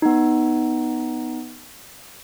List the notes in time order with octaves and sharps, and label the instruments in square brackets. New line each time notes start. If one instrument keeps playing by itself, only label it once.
[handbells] B3 D#4